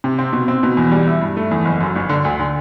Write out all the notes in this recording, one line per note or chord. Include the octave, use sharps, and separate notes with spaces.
C3
C4
B2
C4
B2
E2
G3
E4
G2
A3
E2
F#1
F#2
G1
D3
D2
D3